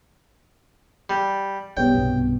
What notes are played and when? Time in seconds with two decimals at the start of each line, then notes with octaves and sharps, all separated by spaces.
1.10 G3
1.77 B1 G3 B3 G4 C#5 G5
1.95 C2 G2 B2